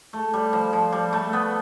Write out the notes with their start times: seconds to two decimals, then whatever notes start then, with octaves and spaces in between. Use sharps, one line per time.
0.13 A3
0.33 G3
0.53 F3
0.73 F3
0.92 G3
1.13 A3
1.33 B3